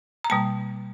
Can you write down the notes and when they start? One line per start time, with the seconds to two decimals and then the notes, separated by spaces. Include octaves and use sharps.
0.24 A#5
0.30 B2 G3 A#3 A5